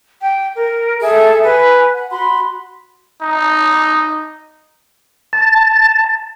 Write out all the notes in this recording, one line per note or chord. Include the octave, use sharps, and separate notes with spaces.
G5
A#4
G#4 A4 E5
B4 G#5
F#5
F#4 B5 C6
D#4
A5